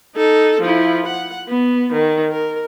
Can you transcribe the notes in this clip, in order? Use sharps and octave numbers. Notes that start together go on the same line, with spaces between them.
D#4 A4
F3 E4
F#5
B3
D#3
A#4